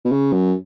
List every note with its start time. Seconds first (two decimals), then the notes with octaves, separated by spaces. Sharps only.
0.05 B2
0.12 C#3
0.33 F#2